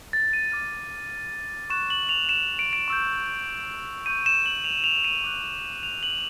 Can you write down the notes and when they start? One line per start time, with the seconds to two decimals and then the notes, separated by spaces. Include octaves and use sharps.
0.13 A6
0.33 D#7
0.52 D6 F6
1.70 C#6 F#6 E7
1.90 F#7
2.09 F7
2.29 E7
2.59 D7
2.73 D7
2.88 C#6 E6 G6
4.06 C#6 E6 G6 D#7
4.26 E7
4.46 F#7
4.64 F7
4.84 F7
5.04 D#7
5.24 D6 F#6
5.83 F7
6.03 F#7